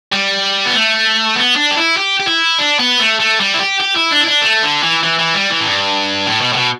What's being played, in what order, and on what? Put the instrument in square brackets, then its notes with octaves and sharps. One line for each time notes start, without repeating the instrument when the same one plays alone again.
[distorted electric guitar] G3
B3
A3
B3
D4
G4
E4
G4
G4
E4
D4
B3
A3
A3
G3
E4
G4
G4
E4
D4
E4
D4
A3
D3
E3
E3
E3
G3
E3
A2
G2
A2
B2
A2
B2